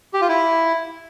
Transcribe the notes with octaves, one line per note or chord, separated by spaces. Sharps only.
G4
F4
E4